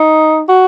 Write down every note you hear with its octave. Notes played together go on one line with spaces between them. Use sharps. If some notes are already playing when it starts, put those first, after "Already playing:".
Already playing: D#4
F#4